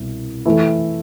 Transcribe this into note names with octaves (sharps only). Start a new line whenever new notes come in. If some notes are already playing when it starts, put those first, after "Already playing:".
Already playing: C2 B2
E3 A3 E4